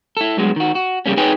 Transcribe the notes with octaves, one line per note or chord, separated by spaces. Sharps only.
E4 A4
G2 F#3 G#3 B3
D#3 F#4
F#4
C#3 G3 A#3 C#4
D#4 G#4 B4 C#5 G5 G#5